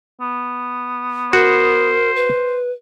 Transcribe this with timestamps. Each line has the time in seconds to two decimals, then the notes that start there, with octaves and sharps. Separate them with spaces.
0.21 B3
1.33 F#4 A#4 C5
2.16 B4